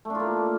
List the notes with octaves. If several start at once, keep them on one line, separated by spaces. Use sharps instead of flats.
A3 A#3 D4 F4